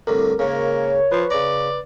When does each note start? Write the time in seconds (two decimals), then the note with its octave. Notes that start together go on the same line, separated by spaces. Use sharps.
0.07 C2 A2 D3 A#4
0.39 G#2 C#3 A#3 C#5
1.12 F3 B4
1.30 C#3 D5 A#5